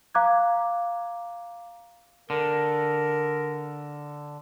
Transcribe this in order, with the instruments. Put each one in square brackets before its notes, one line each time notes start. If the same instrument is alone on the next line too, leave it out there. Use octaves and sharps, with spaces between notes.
[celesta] F5 A#5 D6 F#6 G#6
[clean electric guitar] D3 [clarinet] A#4